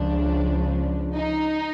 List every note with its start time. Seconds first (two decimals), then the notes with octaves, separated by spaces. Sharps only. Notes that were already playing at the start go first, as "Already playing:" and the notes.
Already playing: C#2 C#3 F3 D4
1.14 D#4